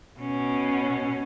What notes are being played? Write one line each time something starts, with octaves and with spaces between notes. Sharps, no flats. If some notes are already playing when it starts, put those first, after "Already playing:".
B2 C#4